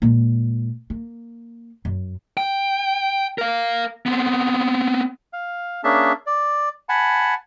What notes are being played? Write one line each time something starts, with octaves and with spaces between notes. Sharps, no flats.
A#2 G#3
A#3
F#2
G5
A#4 F5
B3 C4
F5
A#3 C#4 D4 G#4 E5 A5
D5
F#5 G#5 A5 B5